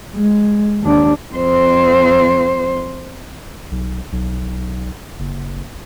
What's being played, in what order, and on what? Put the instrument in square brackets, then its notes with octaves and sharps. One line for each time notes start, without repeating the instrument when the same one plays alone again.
[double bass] G#3
D#2 D4
[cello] F2 C5
[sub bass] B1
B1
F#1